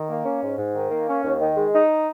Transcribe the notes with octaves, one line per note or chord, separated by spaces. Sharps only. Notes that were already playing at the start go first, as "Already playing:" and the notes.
Already playing: D#3
A#3
C#4
G#2
G#2
D#3
A#3
C#4
D#2
D#3
G#3
D#4